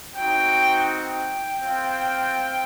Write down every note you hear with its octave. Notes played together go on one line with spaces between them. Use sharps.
C4 D#4 F#4 G5
G5
C4 F4